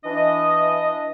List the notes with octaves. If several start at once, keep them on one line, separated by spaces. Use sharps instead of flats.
E3 D4 D#5